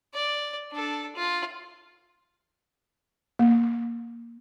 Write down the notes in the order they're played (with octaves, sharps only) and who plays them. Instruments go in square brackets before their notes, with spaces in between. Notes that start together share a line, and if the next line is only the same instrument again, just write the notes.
[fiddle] D5
D4 A4
F4
[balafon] A#3